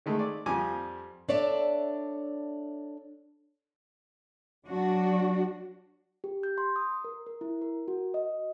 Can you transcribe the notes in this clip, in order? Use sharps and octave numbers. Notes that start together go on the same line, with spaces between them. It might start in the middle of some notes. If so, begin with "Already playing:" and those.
D#3 G#3 A3
D5
F2 F3 G3 G#5 D6
D4 A4 C#5 D5 E5
F#3 D4 F#4
G4
G6
C6
D#6
A#4
A#4
E4
A#4
F#4
D#5